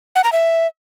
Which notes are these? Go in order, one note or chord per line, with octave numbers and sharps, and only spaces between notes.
F#5
A#5
E5